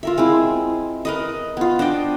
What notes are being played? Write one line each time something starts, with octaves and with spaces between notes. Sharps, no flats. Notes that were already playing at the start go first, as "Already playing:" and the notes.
F4 A#4 E5
G#3 C4 E4
A#4 B4 D#5
B3 F4
D4 C5 D#5 G5